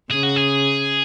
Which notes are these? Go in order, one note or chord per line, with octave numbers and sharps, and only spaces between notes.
C#3 G#4
F#4
G#4